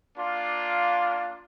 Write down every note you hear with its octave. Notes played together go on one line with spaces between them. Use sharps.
A#3 D4 F4